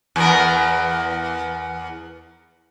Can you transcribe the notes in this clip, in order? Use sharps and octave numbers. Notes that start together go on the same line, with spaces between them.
E2 B3 A#4